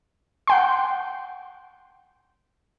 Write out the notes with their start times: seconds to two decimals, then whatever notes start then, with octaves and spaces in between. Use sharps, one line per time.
0.47 F#5 G5 C6